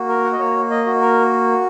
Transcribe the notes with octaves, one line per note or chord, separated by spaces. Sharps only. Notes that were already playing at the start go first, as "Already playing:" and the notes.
Already playing: A#3 F#4
A#4
F#5
D#5
A#3 C#5
D#5
F#4
A#4